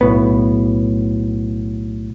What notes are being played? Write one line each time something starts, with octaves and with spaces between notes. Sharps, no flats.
B1 A2 B3